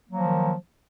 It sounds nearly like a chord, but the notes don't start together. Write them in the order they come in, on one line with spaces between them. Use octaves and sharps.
A#3 F#3 F3 D#3